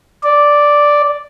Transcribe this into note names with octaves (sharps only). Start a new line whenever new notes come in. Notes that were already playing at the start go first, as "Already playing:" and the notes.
D5